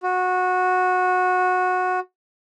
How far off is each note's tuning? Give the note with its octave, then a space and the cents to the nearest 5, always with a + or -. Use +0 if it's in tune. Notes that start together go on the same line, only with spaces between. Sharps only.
F#4 -15